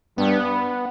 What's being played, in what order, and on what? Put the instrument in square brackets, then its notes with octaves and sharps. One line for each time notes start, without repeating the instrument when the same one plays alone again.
[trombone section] G2 [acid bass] B3